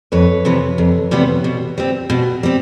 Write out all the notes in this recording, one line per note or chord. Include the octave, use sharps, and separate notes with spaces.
F2 B4 C#5
C3 E3 G3 B3
F2
C3 E3 G3 B3
B2
G3 C4
B2
G3 C4